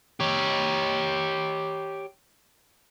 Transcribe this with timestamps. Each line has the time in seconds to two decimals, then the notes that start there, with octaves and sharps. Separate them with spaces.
0.20 G4 C#5